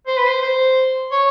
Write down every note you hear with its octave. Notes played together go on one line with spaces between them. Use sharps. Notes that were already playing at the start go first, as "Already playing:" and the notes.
C5
B4
C5
C5
C#5